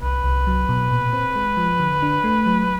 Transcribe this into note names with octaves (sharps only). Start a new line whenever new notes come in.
C2 B4
C2
F#3
B2
A#2
C4
G#3
F3
D3
D4
A3
F#3